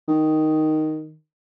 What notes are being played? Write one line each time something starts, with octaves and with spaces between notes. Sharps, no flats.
D#3